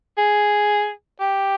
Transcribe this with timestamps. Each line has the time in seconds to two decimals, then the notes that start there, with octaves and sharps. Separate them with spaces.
0.18 G#4
1.20 G4